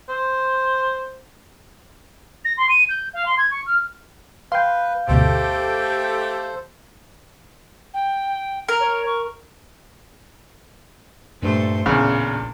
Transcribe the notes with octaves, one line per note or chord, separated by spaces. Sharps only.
C5
A#6
C6
D#7
G6
F5
C6
G#6
C#6
F6
B4 F5 G5 C6 G6
G1 D2 B2 A3 G4 A4 C5
G5
A#4
C#5
C#6
G2 A#2 A3 C5
A1 E2 A#2 C#3 D4